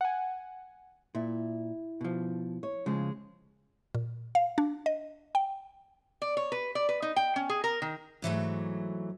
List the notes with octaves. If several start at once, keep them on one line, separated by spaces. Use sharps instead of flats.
F#5 G#5
A#2 E4
B2 F3
C#5
C#3 F3 G#3
A#2
F5
D4
D#5
G5
D5
C#5
B4
D5
B4
D#4
G5
C#4
G#4
A#4
D#3
G#2 E3 F#3 A3